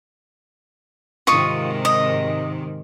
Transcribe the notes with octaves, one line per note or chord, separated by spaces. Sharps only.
G#2 C3 D#3 F4 D#5 C#6
D#5